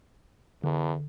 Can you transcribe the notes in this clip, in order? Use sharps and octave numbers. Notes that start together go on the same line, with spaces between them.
E2 D3